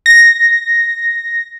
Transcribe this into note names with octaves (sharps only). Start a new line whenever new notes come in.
A#6